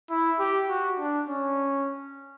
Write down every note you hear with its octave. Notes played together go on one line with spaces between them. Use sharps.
E4
G4
F#4
D4
C#4